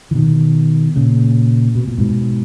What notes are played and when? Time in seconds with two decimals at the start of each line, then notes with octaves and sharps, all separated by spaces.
0.11 E3
0.15 B2 D#3
0.96 A#2 C#3
1.75 B2
1.88 A#2
1.98 G#2 B2